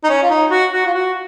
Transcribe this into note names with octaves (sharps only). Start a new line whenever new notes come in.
D#4
C#4
F4
D#4
F#4
F#4
F4
F#4